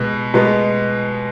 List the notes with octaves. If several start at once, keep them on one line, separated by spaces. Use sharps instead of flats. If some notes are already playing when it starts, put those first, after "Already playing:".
Already playing: B2 G#3 B3
B2 G#3 B3